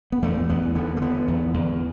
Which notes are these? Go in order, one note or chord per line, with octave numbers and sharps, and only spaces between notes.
B3
E2 A3
E2 B3
D3 B3
A3
D3 B3
E2
E2